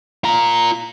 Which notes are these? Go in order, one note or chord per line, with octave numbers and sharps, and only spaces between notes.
F4 A#5